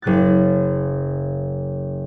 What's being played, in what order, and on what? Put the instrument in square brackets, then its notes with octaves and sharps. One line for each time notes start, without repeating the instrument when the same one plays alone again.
[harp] F#1 C#3 F#6 A6